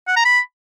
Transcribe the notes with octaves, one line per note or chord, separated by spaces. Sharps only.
F#5
A#5
B5